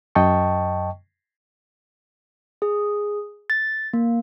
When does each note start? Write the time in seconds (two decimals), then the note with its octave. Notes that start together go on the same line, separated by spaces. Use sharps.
0.15 F#2 D#5 G5 A5 C#6
2.62 G#4
3.50 A6
3.93 A#3